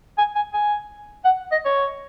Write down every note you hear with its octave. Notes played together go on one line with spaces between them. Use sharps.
G#5
G#5
G#5
F#5
D#5
C#5